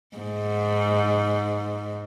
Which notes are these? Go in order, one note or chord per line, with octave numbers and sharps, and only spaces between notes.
G#2